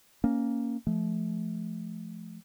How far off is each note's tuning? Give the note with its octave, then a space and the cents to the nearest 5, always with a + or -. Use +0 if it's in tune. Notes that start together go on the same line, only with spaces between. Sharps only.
A#3 +0 C#4 +0
F3 -20 A3 -30